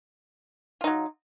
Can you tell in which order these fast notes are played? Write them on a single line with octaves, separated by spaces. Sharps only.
F4 D#4 F#3